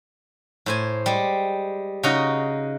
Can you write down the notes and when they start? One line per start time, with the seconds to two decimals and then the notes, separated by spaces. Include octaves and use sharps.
0.66 A2 C5 G#5
1.06 G3 G#3
2.03 C#3 D#4 F#4 A#5